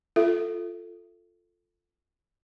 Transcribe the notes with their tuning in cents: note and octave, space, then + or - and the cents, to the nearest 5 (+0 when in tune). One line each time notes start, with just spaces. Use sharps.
F4 +0 A4 +0 E5 +30